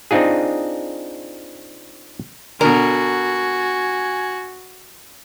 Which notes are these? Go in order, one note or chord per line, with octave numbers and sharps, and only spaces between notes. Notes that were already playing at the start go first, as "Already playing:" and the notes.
C4 D4 D#4 F4 G#4
B2 D3 F#4 A#4 G#5